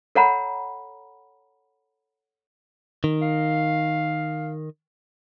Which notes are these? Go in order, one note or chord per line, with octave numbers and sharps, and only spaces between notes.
A4 C#5 F#5 A#5 B5
D#3
F5